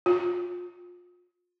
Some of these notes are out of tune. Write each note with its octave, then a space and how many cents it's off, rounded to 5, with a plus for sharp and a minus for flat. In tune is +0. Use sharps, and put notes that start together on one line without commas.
F4 +30